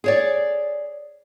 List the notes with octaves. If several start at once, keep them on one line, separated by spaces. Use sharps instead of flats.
G#4 C#5 D5